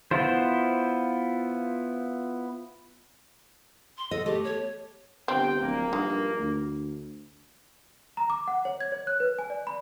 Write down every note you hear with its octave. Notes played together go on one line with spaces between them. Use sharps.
B3 E4 F4 C5
C6
A4 D#5
A3 G4
C#5
G1 C3 C4 G5
D1 A#1 A#3
G2 D#3
D2
A#5
D6
F#5
C#5
G#6
C#5
F#6
B4
G#5
D5
B5